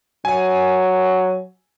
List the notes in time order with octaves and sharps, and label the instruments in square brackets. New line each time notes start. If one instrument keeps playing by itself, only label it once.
[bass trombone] F#3 [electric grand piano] G#5